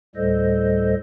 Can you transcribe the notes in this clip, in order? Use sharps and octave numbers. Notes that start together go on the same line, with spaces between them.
D2 A2 G3 A4 C5 D#5